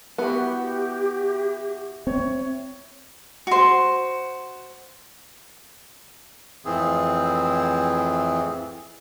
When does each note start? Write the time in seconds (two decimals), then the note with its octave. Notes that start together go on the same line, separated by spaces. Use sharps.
0.18 B3 E4 F#4 G4
2.07 C4 C#5
3.47 F#4 C5
6.65 F2 A2 E3 C4 G#4